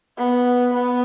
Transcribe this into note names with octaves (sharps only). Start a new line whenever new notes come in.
B3
B3